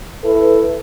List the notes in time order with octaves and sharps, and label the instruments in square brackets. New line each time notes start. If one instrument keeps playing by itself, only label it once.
[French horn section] E4 A4 B4